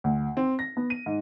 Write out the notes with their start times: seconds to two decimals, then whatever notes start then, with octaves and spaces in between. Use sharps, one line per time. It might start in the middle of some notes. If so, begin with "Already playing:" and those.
0.04 D2
0.37 C4
0.59 A#6
0.77 B3
0.90 D#7
1.06 G#2